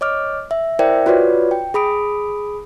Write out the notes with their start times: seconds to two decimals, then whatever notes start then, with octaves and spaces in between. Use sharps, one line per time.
0.01 C#5 D#5 D6 F6
0.51 E5
0.79 E4 A#4 C5 D5 E5 G5
1.06 F4 F#4 B4 C#5 D5
1.51 G5
1.74 G#4 B5 D#6 D7